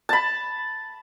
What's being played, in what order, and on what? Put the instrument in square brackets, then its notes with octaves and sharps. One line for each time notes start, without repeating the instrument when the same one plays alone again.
[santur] A5 B5